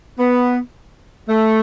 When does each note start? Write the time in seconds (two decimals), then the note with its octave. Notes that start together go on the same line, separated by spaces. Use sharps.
0.19 B3
1.29 A3